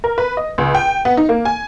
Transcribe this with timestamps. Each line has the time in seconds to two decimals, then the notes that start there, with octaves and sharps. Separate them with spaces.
0.04 A#4
0.18 B4
0.37 D#5
0.58 C#2
0.75 G5
1.05 B3
1.17 D#4
1.29 A#3
1.45 G#5